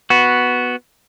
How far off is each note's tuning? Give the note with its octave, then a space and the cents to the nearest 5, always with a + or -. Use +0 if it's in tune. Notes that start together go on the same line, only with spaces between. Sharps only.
B3 +0 F#4 +0